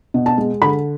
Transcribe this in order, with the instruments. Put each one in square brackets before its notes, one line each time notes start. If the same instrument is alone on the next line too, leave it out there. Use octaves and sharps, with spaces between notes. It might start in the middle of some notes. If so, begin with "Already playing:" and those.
[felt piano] B2
A5
G#3
D3 B5